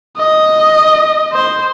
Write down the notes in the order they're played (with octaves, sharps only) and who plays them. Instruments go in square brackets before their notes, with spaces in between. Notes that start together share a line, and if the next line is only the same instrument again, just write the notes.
[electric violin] D#5
C5